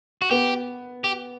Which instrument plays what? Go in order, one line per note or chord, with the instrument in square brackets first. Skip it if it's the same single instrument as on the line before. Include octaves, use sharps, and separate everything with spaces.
[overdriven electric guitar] F#4
[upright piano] B3 [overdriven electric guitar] G4
[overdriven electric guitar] G4